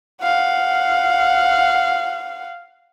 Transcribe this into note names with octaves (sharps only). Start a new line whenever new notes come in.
F5 F#5